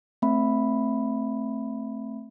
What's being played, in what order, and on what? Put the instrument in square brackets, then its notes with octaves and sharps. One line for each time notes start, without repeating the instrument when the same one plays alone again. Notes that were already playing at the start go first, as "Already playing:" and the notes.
[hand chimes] A3 C4 E5 B5